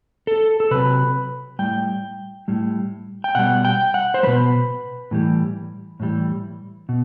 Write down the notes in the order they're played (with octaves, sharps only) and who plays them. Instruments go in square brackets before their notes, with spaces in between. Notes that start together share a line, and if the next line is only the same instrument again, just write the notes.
[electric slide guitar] A4
A4
C3 F#3 B4
A2 G3 G5
A2 G3
G5
B2 G3 F#5
G5
F#5
C5
B2 G3 B4
A2 E3 G3
A2 E3 G3
B2